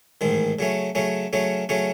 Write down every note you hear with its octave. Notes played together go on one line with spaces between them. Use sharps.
A1 G#2 D#3 G#3
C#3 F#3 A3 C#4
C#3 F#3 A3 C#4
C#3 F#3 A3 C#4
C#3 F#3 A3 C#4